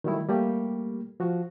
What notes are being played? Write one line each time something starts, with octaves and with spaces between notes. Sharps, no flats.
D#3 F#3 G3 A3 E4
G3 A3 A#3 G4
F3 F#4